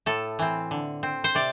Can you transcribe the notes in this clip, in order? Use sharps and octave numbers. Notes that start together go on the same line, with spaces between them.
A2 A4
E3 C4
D3
C4
C5
C3 D5